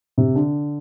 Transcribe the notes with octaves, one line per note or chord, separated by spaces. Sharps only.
C3
D3